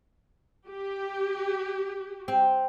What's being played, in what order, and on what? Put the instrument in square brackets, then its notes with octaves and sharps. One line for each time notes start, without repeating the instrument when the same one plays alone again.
[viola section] G4
[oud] C4